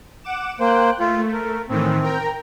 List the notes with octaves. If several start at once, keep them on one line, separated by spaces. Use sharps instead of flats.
F#5 D6 E7
A#3 C5 G5 F#6
A3 F4
A#4
A2 D#3 E3 C4
A#4 G5 A#5